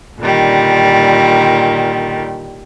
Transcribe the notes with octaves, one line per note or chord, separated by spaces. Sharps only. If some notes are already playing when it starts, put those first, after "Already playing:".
A#2 D3 D#3 G3